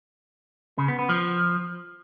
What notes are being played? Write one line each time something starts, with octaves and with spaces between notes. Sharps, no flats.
C#3
B3
B3
F3